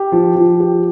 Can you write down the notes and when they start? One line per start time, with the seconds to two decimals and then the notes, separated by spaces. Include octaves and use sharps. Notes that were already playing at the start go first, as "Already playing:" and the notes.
Already playing: G4
0.12 F3
0.36 F3
0.60 G4